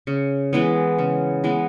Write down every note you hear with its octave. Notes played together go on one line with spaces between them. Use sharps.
C#3
E3 G#3 B3
C#3
E3 G#3 B3